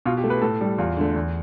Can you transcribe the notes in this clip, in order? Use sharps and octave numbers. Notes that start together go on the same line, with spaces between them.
B2 F4
G4
A3
B4
A2 A4
G3
E2 F4
D3 A3
E2